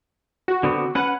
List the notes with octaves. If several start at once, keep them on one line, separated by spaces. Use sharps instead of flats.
F#4
D3 B3 C4
C#4 B4 F#5